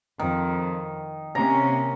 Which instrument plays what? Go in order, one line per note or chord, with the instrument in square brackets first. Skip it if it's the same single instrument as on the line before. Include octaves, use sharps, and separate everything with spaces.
[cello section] F2 [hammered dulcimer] D#3
[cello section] C3 A#3 C#4 [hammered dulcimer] A#5